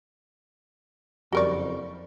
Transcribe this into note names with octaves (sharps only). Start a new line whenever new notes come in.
F#1 F2 G3 F#4 A#4 D5 C#6